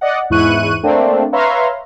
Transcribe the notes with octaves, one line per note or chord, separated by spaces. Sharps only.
D5 D#5 F#5
E2 G#2 E4 C#6 F#6 D#7
A3 A#3 C4 D4
B4 C#5 E5 F5 A#5 C6